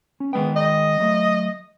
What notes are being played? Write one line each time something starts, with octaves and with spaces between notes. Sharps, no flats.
C#4
D#3 G#3 B3 G5
D#5
F#3 A3